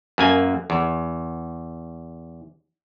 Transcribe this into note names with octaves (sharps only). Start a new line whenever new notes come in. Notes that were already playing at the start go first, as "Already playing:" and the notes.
F#2 A#3 G#5
E2